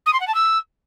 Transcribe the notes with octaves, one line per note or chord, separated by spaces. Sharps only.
D#6
C6
F#5
A5
E6